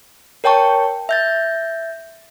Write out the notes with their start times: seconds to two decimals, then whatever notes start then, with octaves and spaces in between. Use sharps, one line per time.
0.44 A#4 C#5 G5 A5 C#6
1.09 E5 G6 A6